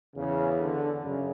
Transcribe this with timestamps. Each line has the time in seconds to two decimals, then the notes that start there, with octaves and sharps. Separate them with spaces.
0.16 E2 C#3
0.59 D3
1.03 F#2 C#3